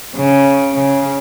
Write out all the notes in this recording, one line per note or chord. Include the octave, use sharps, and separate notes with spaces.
C#3
C#3